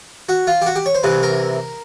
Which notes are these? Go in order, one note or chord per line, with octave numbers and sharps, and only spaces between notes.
F#4
F4
G4
F#4
G4
C#5
C5
C2 C3 E3 B4
A#4